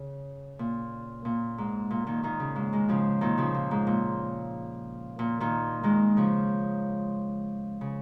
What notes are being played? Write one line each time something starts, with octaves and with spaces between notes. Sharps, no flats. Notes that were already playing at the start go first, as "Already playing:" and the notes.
Already playing: C#3
A#2
A#2
G#2
A#2
A#2 D#3
A#2 D#3
C#3
G#2
D#3 G#3
C#3 F3
A#2 D#3
C#3 F3
A#2
G#2
A#2
A#2
A#2 D#3
D#3 G#3
C#3 F3
C#3